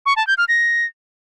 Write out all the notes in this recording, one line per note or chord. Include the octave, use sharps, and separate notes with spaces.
C#6
A5
G6
F6
A#6